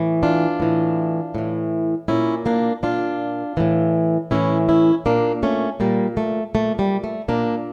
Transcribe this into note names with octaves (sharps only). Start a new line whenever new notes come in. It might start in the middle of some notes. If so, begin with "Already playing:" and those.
Already playing: A2 E3
D4 F4
A2 E3
A2 E3
A#2 C#4 E4
A#3 D4
A#2 D4 F4
A2 E3
A2 E3 C#4 E4
C#4 E4
A#2 A#3 D4
A3 C#4
A#2 G3 A#3
A3
A#2 A3
G3
A3
A#2 A#3 D4